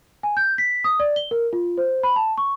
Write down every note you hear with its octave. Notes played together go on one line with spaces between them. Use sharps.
G#5
G6
B6
D#6
D5
G7
A#4
F4
C5
B5
A5
C#6